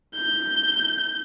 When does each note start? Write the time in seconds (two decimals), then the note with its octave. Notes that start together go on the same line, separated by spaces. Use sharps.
0.15 G6